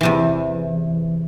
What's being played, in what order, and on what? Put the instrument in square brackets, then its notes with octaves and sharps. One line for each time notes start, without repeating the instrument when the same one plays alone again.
[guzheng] E2 C3 E3